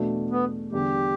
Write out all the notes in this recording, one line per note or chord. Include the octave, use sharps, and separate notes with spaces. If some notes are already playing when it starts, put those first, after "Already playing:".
Already playing: E2 B2 A3 D4
B3
E2 D3 G3 G4